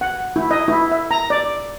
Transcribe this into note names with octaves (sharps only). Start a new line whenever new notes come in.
F#5
E4
D#5
E4
E5
A#5
D5